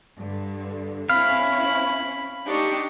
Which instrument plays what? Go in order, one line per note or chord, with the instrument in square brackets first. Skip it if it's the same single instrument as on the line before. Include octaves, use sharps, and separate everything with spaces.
[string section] G2 D3
[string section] C4 C#4 E4 [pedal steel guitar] F5 [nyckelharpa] B5
[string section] D4 G4 [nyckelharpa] D#4 C#6